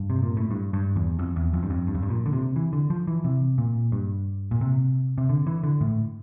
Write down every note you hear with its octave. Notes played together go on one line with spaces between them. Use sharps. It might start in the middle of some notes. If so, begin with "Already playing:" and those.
Already playing: G2
C3
A#2
A2
G2
G2
E2
F2
E2
F2
G2
F2
G2
F2
G2
A#2
D3
C3
E3
D3
F3
E3
C3
A#2
G2
A#2
C3
C3
D3
E3
D3
A2